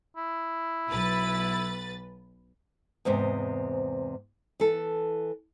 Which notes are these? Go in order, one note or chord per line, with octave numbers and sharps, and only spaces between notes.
E4
B1 B4 A6
E2 G#2 C3 C5
E3 A4